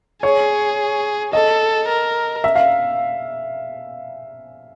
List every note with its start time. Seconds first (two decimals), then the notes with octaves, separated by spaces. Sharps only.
0.23 G#4 C#5
1.33 A4 D#5
1.89 A#4
2.44 E5
2.55 F5